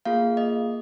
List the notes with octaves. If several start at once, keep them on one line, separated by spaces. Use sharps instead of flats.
A#3 F4 G#4 F5
D#5